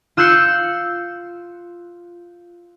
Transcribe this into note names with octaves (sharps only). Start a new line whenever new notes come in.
F4 E6 F#6 G6 C7 C#7